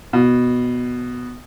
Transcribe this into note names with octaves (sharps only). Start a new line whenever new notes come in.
B2